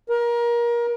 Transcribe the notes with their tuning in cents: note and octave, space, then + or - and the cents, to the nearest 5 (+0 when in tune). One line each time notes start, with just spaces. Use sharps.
A#4 +25